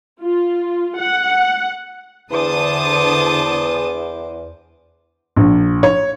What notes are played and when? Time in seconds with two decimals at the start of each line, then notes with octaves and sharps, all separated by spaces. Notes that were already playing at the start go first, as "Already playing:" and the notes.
0.22 F4
0.98 F#5
2.31 E2 D3 C5 A5 D6 D#6
5.36 A#1
5.83 C#5